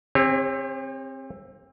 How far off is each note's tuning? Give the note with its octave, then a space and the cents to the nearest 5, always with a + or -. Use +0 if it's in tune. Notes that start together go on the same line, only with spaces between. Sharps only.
C4 +15 G4 +45 C#5 -30